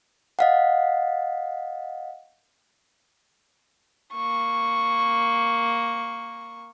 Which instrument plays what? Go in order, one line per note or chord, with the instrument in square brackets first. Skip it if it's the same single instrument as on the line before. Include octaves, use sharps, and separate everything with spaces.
[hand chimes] D#5 F5 F#5
[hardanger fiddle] A#3 C#6